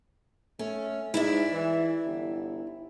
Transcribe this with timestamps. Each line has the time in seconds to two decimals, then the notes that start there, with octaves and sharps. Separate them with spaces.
0.59 A3 C#4
1.14 G#2 E4 D5 E5
1.53 E3
2.05 G1